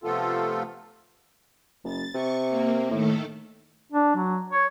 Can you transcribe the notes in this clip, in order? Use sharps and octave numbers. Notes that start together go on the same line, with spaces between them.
C3 F3 A3 B3 F4 A4
F#1 A6
C3 C#6
A#3
A2 D#3 A3 A4
D4
F#3
C#5